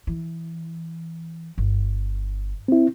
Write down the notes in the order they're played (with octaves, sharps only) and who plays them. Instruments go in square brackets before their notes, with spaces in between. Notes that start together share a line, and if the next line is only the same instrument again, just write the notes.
[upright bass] E3
G1
[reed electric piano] C4 E4